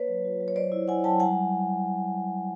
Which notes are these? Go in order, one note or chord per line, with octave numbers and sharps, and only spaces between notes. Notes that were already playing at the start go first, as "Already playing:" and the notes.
Already playing: A#3 B4 C#5
F#3
F4
F#3
C#5
F#3 C5 D5
E4
E4 F#5 G#5
F#3 G5 A5
G3 F#5 G#5